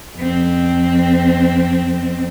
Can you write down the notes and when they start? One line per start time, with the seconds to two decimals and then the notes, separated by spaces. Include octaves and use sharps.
0.17 F2 C4